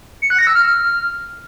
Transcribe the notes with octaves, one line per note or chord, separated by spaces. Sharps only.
C#7
F#6
A#6
E6
F6